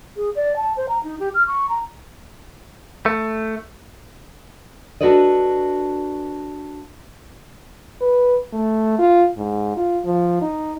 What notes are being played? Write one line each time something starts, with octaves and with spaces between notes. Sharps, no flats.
G#4
D5
A5
C5
A#5
D#4
G4
F6
C#6
A#5
A3
D4 F#4 A4 B4 D5 D#5
B4
A3
F4
G#2
F4
F3
D#4